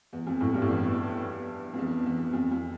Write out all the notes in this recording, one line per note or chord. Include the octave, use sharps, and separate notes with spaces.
E2
F2
F2 A2
G2
A2
E2 G2
F2
E2
E2
F2
F2